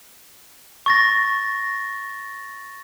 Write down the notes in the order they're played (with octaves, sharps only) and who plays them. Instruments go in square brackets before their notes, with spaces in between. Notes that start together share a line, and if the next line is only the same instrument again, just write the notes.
[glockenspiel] C#6 A6 A#6